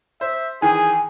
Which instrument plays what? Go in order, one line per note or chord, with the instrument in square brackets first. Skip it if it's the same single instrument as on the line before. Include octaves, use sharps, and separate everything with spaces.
[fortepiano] C5 [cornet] E5
[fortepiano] D#3 E3 [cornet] G#4 [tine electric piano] G#5